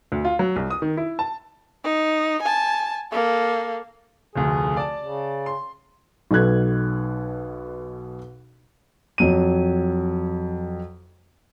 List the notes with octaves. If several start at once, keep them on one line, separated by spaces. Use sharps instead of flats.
D2
F4
F#3
C2
D#6
D#3
E4
A5
D#4
G#5 A5
A#3 A4
F1 D2 G#4
D5 A5
C#3
C6
B1 B2 A4 F#6 G#6
F2 F#3 D#7